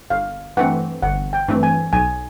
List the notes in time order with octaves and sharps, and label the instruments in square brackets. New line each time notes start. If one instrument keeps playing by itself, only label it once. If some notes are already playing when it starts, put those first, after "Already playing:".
[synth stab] G1 [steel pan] F5
[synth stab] G2 E3 A3 C4 [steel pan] F#5
[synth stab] G1 [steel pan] F#5
[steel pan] G5
[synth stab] G2 E3 A3 C4
[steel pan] G#5
[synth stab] B1 [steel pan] G#5